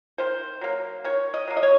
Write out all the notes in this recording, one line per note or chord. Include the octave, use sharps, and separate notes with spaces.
D#3 C5
F#3 A#3
D#3 C#5
D#5
F#3 A#3
D#5
C#5